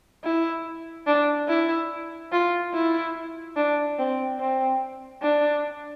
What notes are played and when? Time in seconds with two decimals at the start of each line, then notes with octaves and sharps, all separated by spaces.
0.24 E4
1.07 D4
1.48 E4
2.32 F4
2.74 E4
3.57 D4
3.99 C4
4.39 C4
5.22 D4